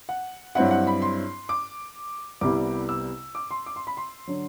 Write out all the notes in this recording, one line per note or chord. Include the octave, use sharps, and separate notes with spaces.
F#5
G2 F#3 C4 E4 F#5
F#5
B5
C6
D6
C2 C3 G3 B3 E4 D6
E6
D6
C6
D6
C6
B5
C6
D3 F#3